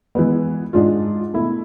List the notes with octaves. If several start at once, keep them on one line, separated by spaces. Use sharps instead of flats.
E3 G#3 B3
G#2 G#3 D4 F4
B2 A3 E4